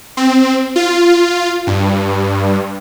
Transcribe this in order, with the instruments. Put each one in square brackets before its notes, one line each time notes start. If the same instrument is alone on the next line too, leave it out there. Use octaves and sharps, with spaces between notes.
[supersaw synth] C4
F4
G2